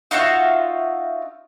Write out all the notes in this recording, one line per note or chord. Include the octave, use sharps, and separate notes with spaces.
D#4 F4 F#4 E5